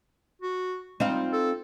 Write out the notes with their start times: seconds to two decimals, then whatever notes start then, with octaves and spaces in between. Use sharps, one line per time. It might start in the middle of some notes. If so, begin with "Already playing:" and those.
0.42 F#4
1.00 G3 C4 D#4 F4
1.33 A4